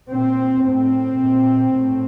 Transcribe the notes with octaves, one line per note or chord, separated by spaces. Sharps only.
A#2 C4
A2 C4
A#2
A2